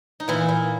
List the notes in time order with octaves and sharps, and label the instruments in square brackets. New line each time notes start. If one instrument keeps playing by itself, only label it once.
[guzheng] D#4
A#2 E3 E4
A#2